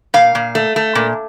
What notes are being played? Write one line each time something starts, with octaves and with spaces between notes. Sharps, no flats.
A#2 F5
A#2
A3
A3
A#2